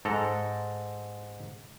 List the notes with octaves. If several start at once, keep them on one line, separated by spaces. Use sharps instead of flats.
G#2 A4 A#5